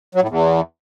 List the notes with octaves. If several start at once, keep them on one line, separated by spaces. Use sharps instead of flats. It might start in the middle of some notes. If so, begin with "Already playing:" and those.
F#3
A2
E2